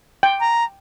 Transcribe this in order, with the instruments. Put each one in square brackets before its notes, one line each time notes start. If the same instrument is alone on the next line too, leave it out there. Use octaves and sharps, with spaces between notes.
[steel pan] G5
[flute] A#5